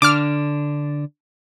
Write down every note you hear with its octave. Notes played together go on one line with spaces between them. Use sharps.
D3 D4 D6 F6